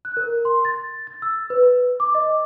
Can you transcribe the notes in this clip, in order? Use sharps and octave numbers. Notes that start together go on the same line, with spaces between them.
F#6
A#4
C6
A6
A6
E6
B4
D6
D#5